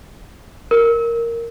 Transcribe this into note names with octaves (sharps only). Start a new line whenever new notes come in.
A#4